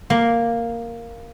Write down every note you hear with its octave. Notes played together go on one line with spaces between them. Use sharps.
A#3